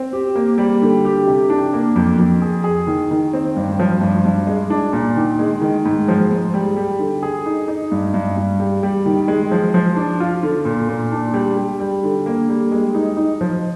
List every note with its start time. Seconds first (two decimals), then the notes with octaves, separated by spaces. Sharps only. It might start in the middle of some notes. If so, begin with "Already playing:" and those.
Already playing: C4
0.13 G4
0.36 A#3
0.58 G3
0.82 D3
1.05 G4
1.27 C3
1.50 D4
1.74 A#3
1.96 F2
2.18 F2
2.42 G#4
2.64 G#4
2.87 D#3
3.11 D#3
3.33 C4
3.56 G2
3.80 F3
4.01 G2
4.25 G2
4.47 G#3
4.70 D4
4.93 A#2
5.16 D#3
5.39 G#3
5.61 D#3
5.85 G#2
6.08 F3
6.31 G#2
6.54 G3
6.77 G3
7.00 D3
7.23 G#4
7.46 D#4
7.68 D#4
7.92 G2
8.14 G2
8.37 G2
8.60 G3
8.83 G3
9.06 D#3
9.28 G#3
9.52 F3
9.74 F3
9.96 D4
10.20 F4
10.43 D3
10.65 A#2
10.89 A#2
11.12 D4
11.34 G3
11.57 G3
11.80 G3
12.03 D3
12.26 A#3
12.49 G3
12.72 G#3
12.95 D#4
13.17 D#4
13.41 F3